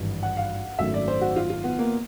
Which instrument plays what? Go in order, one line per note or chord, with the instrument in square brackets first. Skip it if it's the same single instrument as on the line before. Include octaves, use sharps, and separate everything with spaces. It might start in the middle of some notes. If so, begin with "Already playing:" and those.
Already playing: [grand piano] G#1 G2 E3
[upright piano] F#5
F5
[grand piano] G#1 F#2 D#3 F#3 A3 [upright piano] E5
[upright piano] D5
C5
F#4
F4
F4
B3
A#3